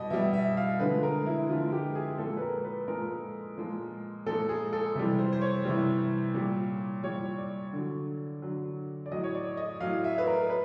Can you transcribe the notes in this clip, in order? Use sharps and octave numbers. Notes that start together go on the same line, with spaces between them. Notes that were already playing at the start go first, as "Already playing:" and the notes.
Already playing: B2 G3 D#5
B2 G3 E5
E5
F5
D3 F3 G#3 B4
A#4
E4
D3 F3 G#3 F4
G4
G#4
A#2 F3 G#3 A4
B4
A#4
B4
A#2 F3 G#3 A#4
A#2 F3 G#3
A#2 F3 G#3 A4
G#4
A4
C3 E3 G3
C5
C5
C#5
C3 E3 G3
A#2 G3
A#2 G3 C#5
D5
D3 F#3
D3 F#3
D5
A2 F#3 D#5
C#5
D5
D#5
A2 F#3 F5
E5
B4
A#4
B4